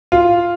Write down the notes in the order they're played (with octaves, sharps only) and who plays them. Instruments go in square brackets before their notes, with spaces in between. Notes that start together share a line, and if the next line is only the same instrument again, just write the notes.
[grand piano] F4